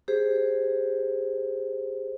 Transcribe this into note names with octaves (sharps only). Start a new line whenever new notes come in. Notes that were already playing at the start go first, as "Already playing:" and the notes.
G4 G#4 C5